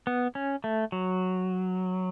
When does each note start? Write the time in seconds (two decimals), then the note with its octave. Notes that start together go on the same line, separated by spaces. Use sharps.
0.07 B3
0.35 C#4
0.64 A3
0.92 F#3